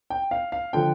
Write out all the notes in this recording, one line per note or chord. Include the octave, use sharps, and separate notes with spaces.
G5
F5
F5
D3 F3 G5